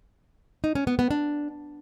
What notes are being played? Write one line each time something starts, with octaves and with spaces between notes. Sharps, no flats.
D#4
C#4
B3
B3
D4